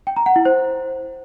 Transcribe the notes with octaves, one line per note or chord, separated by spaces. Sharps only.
G5
A#5
F#5
E4
C5